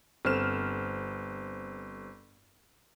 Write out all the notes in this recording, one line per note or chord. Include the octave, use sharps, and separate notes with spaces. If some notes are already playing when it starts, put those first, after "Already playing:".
G1 C4 F6 E7